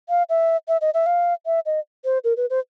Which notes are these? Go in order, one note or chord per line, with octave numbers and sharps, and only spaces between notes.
F5
E5
E5
D#5
E5
F5
E5
D#5
C5
A#4
B4
C5